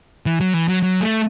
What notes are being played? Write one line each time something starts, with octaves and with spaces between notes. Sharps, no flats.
E3
F#3
E3
F#3
F#3
A3